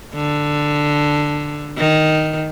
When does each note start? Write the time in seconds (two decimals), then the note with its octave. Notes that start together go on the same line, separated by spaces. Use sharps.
0.15 D3
1.78 D#3